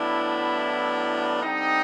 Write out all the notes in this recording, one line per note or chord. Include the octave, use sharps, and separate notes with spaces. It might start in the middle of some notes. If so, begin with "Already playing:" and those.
Already playing: A2 F#3 B3 D4 E4
D3 G3 C4 D#4